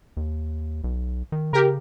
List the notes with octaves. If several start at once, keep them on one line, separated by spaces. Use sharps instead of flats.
D#2
B1
D#3
C#3 G4 A#4